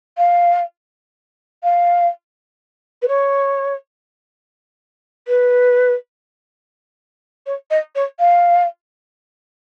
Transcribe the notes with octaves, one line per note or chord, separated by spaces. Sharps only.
F5
F5
B4
C#5
B4
C#5
D#5
C#5
F5